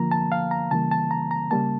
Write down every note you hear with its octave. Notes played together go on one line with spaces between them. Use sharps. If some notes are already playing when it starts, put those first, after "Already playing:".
Already playing: D3 F3 A#3 A#5
A5
F5
A#5
C#3 E3 G3 A#3 A5
A5
A#5
A#5
C#3 G3 A#3 A5